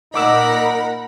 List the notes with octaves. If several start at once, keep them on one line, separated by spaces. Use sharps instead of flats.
A#2 D#4 A#4 D#5 F#5 B5 D6 E6